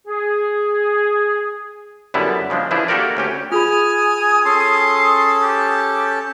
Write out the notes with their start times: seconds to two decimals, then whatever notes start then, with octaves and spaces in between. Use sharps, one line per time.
0.08 G#4
2.14 F#2 D3 G3 B3 E4
2.50 C#3 F3 G#3 D4
2.71 E3 F3 D4 E4 G#4
2.88 A#3 F#4 G4 A4 A#4 D5
3.17 D2 C#4 G4
3.52 F4 G#4 G#5 B5 D#6 F6
4.45 C#4 A4 A5 C6
5.43 G4